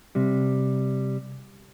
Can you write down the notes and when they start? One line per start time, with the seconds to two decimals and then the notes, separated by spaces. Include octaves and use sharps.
0.15 C3 G3